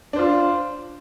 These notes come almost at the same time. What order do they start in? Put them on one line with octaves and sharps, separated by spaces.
D4 C5 F4